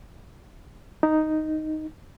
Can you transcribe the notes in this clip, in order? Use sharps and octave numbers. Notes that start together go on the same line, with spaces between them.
D#4